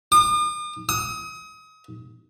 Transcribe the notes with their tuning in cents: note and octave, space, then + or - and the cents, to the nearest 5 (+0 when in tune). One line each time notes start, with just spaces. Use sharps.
D#6 -45
D#6 +30